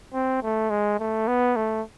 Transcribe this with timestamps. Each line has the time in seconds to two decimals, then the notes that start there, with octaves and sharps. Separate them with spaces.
0.14 C4
0.43 A3
0.70 G#3
1.00 A3
1.28 B3
1.56 A3